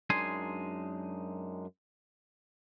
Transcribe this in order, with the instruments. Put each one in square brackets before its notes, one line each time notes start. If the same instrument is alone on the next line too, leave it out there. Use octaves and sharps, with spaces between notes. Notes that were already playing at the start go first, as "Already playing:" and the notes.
[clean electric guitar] F#2 G#3 D4 D#4 G#5 C6